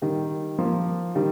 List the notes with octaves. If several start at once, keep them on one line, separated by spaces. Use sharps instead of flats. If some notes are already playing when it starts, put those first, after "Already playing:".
D#3 G3
F3 A#3
D#3 G3